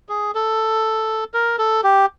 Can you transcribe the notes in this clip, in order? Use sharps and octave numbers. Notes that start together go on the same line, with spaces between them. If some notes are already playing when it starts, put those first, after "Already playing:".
G#4
A4
A#4
A4
G4